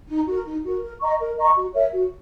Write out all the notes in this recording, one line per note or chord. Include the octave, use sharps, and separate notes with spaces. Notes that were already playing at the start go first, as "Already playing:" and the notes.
D#4
F#4 A#4
D#4
F#4 A#4
A#4
D#5 A#5 C#6
A#4
D#5 A#5 C#6
F#4
A#4 C#5 E5
F#4